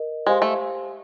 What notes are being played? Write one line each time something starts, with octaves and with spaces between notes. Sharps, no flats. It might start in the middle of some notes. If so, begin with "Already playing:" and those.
Already playing: A#4 D#5
G#3 G4 C5 F5 G#5 C6
A3